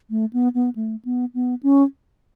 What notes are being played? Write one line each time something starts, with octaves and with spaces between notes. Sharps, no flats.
A3
B3
B3
A3
B3
B3
C#4